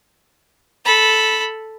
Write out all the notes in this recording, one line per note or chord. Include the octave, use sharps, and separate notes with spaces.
A4 B5